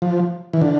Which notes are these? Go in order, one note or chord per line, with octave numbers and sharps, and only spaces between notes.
F3
E3
D3